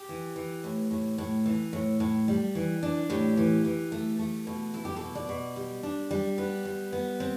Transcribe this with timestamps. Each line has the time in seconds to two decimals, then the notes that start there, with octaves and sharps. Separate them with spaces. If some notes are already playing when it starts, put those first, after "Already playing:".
Already playing: G4
0.09 E3
0.36 E3
0.64 A2
0.91 A2
1.18 A2
1.46 E3
1.73 A2
2.00 A2
2.28 G3
2.55 E3
2.83 D4
3.10 A2 G4
3.37 E3
3.65 E3
3.92 A3
4.19 A3
4.47 B2
4.74 E4 A4
4.85 G4
4.96 B2 A4
5.15 D5
5.29 B2
5.56 G3
5.83 D4
6.11 G3
6.38 B3 B4
6.65 G3
6.93 B3
7.20 C4